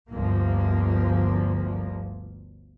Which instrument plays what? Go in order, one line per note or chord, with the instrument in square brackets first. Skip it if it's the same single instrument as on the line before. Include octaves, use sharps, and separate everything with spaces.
[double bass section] G1 D2 F3 A#3